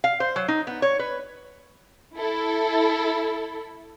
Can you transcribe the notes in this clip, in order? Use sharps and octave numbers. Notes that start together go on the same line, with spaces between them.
F5
C5
F#3
D#4
B3
C#5
B4
E4 A4